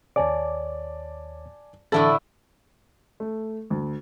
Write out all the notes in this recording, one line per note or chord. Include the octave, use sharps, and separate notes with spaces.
D#2 C#5 D5 G#5 A5 D6
A2 D3 E3 E4 A4 E5 A5 A6
A3
D2